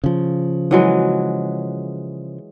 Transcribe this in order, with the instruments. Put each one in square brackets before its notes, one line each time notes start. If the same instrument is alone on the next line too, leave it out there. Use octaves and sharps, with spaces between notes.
[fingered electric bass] C#3 F3
[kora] E3 F#3 G#3